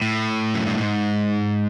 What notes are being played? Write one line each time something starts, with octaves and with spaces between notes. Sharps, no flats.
A2
F#2
G2
G#2